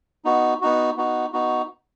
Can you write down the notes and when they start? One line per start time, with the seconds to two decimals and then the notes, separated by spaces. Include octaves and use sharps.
0.25 B3 D#4 F#4
0.62 B3 D#4 F#4
0.97 B3 D#4 F#4
1.33 B3 D#4 F#4